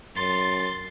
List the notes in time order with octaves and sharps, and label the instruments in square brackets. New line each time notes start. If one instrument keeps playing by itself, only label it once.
[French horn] F#2 [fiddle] C6 [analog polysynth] A6